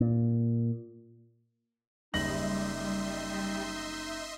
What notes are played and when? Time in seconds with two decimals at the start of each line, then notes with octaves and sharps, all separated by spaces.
0.01 A#2
2.14 F#1 G3 D#4 D#5 E5 C6 A#6 F#7